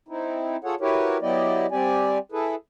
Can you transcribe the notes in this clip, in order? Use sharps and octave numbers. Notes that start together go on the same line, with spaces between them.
C4 D#4 E4
F4 G#4 A4 C#5 F#5
E4 F#4 G4 A#4 B4 C#5
F#3 B3 E4 G4 D5 D#5
G3 C4 G4 D5 G#5
E4 G#4 A4 B4